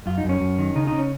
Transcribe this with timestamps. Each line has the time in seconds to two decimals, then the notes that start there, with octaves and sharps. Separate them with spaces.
0.06 F#2 F4
0.18 D#4
0.24 F#2
0.29 C#4
0.41 F#2
0.58 D#3
0.76 C#3 D#4
0.87 C#3 D#4
0.99 C#4